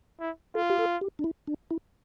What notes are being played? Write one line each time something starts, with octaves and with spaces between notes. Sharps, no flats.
E4
F4 A4
G4
A4
G4
D4
E4
D4
E4